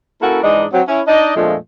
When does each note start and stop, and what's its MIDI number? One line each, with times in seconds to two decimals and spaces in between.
0.21 0.41 58
0.21 0.41 61
0.21 0.41 64
0.21 0.41 66
0.21 0.41 69
0.21 0.41 70
0.43 0.65 44
0.43 0.65 52
0.43 0.65 56
0.43 0.65 62
0.43 0.65 63
0.43 0.65 75
0.72 0.81 54
0.72 0.81 60
0.87 1.01 61
0.87 1.01 64
1.08 1.33 62
1.08 1.33 63
1.08 1.33 74
1.08 1.33 75
1.36 1.55 41
1.36 1.55 46
1.36 1.55 53
1.36 1.55 56
1.36 1.55 57
1.36 1.55 62